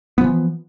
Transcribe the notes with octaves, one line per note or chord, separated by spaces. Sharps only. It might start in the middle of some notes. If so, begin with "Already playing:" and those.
E3 F3 B3